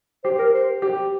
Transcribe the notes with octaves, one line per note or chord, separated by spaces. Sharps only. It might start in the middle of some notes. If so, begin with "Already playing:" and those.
G4 C5
A#4
C5
G4